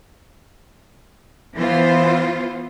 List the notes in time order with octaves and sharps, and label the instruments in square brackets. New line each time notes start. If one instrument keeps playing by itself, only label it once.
[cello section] E3 B3 F4 C5